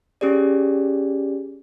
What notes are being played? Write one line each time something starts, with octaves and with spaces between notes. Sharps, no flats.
C#4 G4 G#4 D5